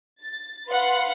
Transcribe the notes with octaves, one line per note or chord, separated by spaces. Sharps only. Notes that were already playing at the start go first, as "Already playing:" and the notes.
A6
B4 F5 F#5 C6